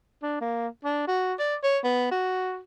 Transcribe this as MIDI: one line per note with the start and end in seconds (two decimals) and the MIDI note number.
0.23 0.40 62
0.41 0.68 58
0.84 1.06 62
1.08 1.34 66
1.39 1.56 74
1.63 1.79 73
1.84 2.11 59
2.11 2.59 66